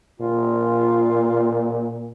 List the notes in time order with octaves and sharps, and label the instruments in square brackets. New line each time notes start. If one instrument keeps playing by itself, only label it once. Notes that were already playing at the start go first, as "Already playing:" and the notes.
[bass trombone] A#2 [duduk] F4